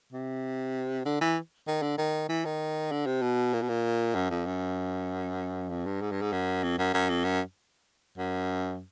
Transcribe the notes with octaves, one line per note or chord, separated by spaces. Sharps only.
C3
D3
E3
D#3
D3
D#3
E3
D#3
D3
C3
B2
A#2
B2
A#2
F#2
F2
F#2
F2
G2
G#2
G2
G#2
F#2
F2
F#2
F#2
F2
F#2
F#2